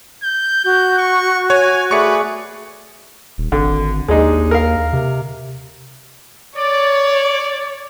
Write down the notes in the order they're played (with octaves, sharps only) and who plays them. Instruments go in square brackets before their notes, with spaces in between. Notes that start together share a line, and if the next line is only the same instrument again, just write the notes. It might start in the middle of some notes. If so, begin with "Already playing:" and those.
[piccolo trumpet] G6
[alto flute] F#4 [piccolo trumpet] G6
[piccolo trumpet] C#6
[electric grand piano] C#5 [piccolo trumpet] G#5
[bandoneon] A3 G#4 D5 [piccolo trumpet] B4 [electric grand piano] C#6 C#7
[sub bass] D#1
[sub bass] G#1 [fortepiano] D3
[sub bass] D#2 [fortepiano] G#3 D4 D#4
[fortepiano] A#4 F5
[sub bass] C3
[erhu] C#5 [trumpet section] D5